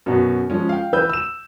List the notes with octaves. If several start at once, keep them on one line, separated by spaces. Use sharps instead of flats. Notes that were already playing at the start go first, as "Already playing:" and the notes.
F#2 B2
F3 G#3 C#4
F5 G5
E3 B4 E6 G6
E6 E7